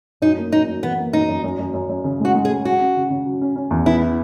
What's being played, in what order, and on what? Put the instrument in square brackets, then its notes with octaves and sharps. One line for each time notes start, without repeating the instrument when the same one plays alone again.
[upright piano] F#2 [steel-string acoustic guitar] D#4
[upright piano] A#3
[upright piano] F#2 [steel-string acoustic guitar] D#4
[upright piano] F#2
[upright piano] E3 [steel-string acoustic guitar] B3
[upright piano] A#3
[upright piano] F#2 [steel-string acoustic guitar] D#4
[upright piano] F#2
F#2
F#2
F#2
F#2
C#3
[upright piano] G#3 [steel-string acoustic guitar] F#4
[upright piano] G#3
[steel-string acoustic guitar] G#4
[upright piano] G#3
[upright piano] F#3 [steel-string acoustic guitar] F#4
[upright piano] C#4
C#3
C#3
F#3
C#4
C#4
E2
[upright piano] B3 [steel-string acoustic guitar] E4
[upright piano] E3